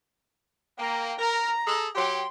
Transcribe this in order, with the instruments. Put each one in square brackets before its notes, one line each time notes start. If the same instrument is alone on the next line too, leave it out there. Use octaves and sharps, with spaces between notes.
[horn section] A#3 [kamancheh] G5 A#5
[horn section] A#4 [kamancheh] A#5
[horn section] G#4 A4
[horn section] F#3 G4 [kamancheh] G5 C6